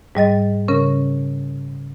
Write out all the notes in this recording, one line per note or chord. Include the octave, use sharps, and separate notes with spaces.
G#2 G3 D#5 A6
C#3 C#4 A#4